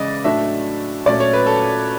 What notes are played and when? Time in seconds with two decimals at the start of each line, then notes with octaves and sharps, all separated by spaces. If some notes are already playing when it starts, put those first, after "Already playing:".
Already playing: C#3 E3 G#3 D5 D#5
0.24 A2 F#3 A3 D4 E5
1.06 A#2 F#3 A3 C#4 D5
1.20 C#5
1.33 B4
1.46 A4